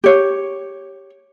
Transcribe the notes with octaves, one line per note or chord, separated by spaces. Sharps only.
G4 C#5